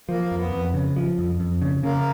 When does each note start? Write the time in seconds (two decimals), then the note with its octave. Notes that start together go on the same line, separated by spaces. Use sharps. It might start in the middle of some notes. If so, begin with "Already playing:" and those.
0.09 F3 A#3
0.31 F2
0.39 B3
0.52 F2
0.74 C#3
0.96 F3
1.19 F2
1.40 F2
1.62 C#3
1.83 C#3 A#3